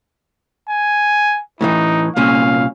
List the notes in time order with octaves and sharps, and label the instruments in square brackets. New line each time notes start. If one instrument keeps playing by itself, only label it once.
[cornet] G#5
[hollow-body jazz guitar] A2 D#3 E3 [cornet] D#4
[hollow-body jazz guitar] C2 A#2 C#4 [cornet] F5